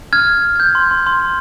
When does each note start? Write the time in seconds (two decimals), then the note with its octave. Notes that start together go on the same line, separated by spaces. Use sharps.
0.13 F6 G#6
0.56 G#6
0.60 G6
0.75 C6
0.91 C6
1.07 C6